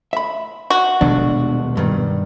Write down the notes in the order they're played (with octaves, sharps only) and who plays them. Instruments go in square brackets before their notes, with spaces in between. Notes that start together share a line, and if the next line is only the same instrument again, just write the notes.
[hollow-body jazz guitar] E5 B5
[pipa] F#4
[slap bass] D#1 B2 G#3 [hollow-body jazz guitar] D4
[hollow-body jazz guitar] G2 D#3